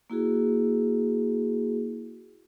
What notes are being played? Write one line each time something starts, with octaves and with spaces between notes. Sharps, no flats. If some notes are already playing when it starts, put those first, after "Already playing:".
A#3 E4 F#4 G#4